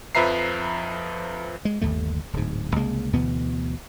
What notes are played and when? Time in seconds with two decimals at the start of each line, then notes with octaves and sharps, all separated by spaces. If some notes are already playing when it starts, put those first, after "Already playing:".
0.15 F2 F3 B4 E5 A#5 C7
1.65 G#3
1.81 G1 D#2 D3 A3
2.33 D1 G#2
2.76 C2 C#3 G#3 A#3
3.13 D2 B2 E3 B3